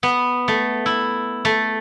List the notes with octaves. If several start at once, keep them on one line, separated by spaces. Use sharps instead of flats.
B3
A3
E4
A3